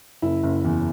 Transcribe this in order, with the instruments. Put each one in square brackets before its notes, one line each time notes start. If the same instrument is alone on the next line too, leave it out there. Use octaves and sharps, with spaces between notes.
[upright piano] F#1 E4
F#1
E2